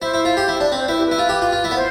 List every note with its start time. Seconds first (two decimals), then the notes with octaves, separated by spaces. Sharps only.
0.02 E4 C5
0.14 E4
0.25 F4
0.37 G4
0.48 E4
0.60 D4
0.72 C4 D5
0.80 C5
0.88 E4 B4
0.98 G4
1.06 B4
1.11 E4
1.19 F4
1.29 G4
1.42 F4
1.53 F4
1.64 E4
1.71 B3
1.76 C5